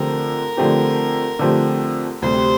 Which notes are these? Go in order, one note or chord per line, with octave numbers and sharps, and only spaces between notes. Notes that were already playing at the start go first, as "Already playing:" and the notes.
Already playing: D3 F3 A3 C4 G4 A#4
D3 F3 A3 C4 G4
D3 F3 A3 C4 G4
D2 C3 G3 C5